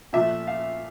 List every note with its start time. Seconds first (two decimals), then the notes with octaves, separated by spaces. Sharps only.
0.13 A#2 F3 A3 E5
0.47 F5